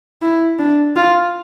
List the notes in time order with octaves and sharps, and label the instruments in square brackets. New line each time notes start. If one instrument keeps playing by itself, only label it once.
[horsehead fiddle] E4
D4
F4